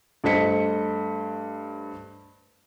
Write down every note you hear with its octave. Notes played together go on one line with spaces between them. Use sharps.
G2 A3 C5 D#5 B6 C#7